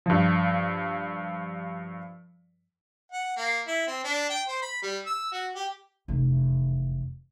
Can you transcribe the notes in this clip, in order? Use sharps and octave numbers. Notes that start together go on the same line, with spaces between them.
G2 F3
F#5
A#3
E4
C4
D4
G5
C5
B5
G3
E6
F#4
G4
F1 E2